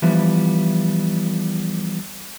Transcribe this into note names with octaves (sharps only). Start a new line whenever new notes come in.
E3 F3 G3 B3 E4